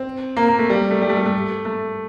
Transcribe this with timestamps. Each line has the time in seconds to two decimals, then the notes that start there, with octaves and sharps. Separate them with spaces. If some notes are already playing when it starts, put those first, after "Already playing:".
Already playing: C4
0.37 A#3
0.48 A#3
0.59 A3
0.70 G3
0.91 A3
1.02 G3
1.09 A3
1.17 G3
1.26 A3
1.65 A3